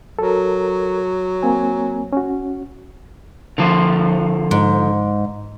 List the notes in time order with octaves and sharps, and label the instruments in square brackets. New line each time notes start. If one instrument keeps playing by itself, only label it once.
[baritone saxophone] F#3 [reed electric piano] A4 A#4
[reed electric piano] A#3 C4 G#5
C#4 F#4
[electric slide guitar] D3 F3
[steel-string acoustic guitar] G#2